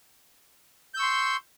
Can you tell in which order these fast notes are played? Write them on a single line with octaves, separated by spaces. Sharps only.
G6 E6 C#6 C6